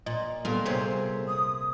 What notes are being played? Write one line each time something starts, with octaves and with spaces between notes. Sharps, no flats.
A#2 D#5
A#2 G3 A#3 B3 F4 A4
C3 G#4 C5 C#5
D#6